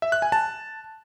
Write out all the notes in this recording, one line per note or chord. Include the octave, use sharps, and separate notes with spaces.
E5
F#6
G#5
A5